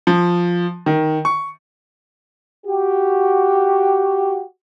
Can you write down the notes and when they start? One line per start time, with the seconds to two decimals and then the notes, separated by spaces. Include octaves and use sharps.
0.07 F3
0.86 D#3
1.25 C#6
2.66 F#4 G4